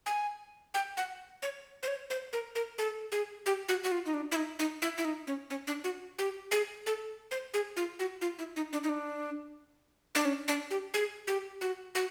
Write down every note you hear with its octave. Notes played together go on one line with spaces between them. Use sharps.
G#5
G5
F#5
C#5
C5
C#5
C5
A#4
A#4
A4
G#4
G4
F#4
F#4
F4
D#4
D4
E4
D#4
D#4
E4
E4
D#4
C#4
C#4
D4
F#4
G4
G#4
A4
C5
G#4
F4
F#4
F4
E4
D#4
D4
D#4
D4
D4
C#4
D4
G4
G#4
G4
F#4
F#4